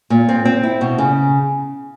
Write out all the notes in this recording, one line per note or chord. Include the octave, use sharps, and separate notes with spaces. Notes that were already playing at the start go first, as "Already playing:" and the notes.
A#2
C4
C4
E4
B2
C#3